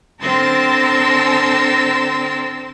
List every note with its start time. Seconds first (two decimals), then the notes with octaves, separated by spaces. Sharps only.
0.21 D3 C4 A#4 A5 C6 E6